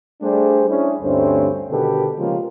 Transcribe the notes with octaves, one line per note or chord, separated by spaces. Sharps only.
G3 A3 D4 G4 G#4 C5
C#4 D4 E4 G#4
D2 G2 A3 C4 C#4 C5
B2 D3 D#3 G4 A4 B4
C#3 F3 G#3 A#3 F4 G4